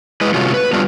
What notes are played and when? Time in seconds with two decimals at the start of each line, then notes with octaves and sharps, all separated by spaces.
0.21 G#3 E4 B4 D#5
0.34 C3 G3 A3 C#4 F4 F#4
0.54 B4
0.73 F#3 G3 A3 B3 D4 F4